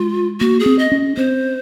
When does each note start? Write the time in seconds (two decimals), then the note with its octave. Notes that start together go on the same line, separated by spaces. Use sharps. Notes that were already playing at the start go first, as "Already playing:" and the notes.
Already playing: G#3 F4
0.40 A#3 F#4
0.60 G#4
0.66 C4
0.79 D#5
0.92 C#4
1.17 C4 C5